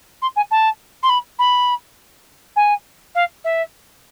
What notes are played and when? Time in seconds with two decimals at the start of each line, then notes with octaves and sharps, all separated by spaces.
0.22 C6
0.36 G#5
0.51 A5
1.03 C6
1.09 B5
1.39 B5
2.56 G#5
3.15 F5
3.44 E5